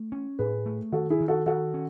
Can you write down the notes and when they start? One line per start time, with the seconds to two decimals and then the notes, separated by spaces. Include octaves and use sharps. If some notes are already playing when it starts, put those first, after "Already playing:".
Already playing: A3
0.12 C#4
0.39 A2 G#4 B4
0.66 A3
0.92 D#3 F#4 A4
1.10 E4 G#4
1.20 D#3
1.28 F#4 A4
1.46 D#3 F#4 A4
1.74 C#4